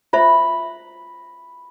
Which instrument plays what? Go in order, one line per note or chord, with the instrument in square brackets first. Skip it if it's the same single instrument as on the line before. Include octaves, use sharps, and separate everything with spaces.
[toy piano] F4 C5 E5 [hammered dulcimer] B5